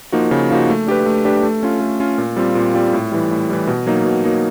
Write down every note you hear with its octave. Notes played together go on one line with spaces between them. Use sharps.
F3 A#3 D#4 F#4
C#3
F3 A#3 D#4 F#4
A3
D4 G4 B4
A3
D4 G4 B4
A3
C#4 F4
A3
C#4 F4
A#2
G3 C4 F4
A#2
G3 C4 F4
A2
E3 G3
A2
E3 G3
B2
F#3 A#3 D#4
B2
F#3 A#3 D#4